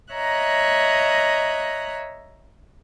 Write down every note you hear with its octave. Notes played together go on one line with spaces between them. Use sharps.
C#5 D#5 E5 A#5 F#6